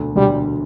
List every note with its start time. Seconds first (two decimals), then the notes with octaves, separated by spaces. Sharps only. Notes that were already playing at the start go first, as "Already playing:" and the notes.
Already playing: E1 D2 D3
0.16 E1 D2 D3 G3